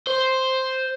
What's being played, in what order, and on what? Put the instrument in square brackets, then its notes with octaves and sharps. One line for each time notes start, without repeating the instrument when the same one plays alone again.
[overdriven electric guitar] C5